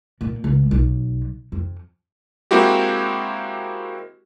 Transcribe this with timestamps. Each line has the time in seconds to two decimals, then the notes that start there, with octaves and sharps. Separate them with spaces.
0.21 A#2
0.44 C#2
0.71 B1
1.52 F2
2.51 G#3 A#3 C4 E4 F#4 G4